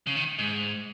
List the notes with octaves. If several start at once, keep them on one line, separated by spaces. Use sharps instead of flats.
C#3
D#3
G#2